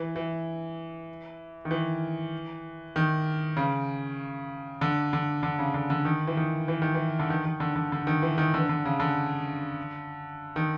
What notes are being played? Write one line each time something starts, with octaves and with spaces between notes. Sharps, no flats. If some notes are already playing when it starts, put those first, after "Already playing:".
Already playing: E3
E3
D#3
E3
D#3
C#3
D3
D3
D3
C#3
D3
D3
D#3
E3
D#3
E3
D#3
E3
D3
D#3
D#3
D3
D3
D3
D#3
E3
D#3
D3
D3
C#3
D3
D#3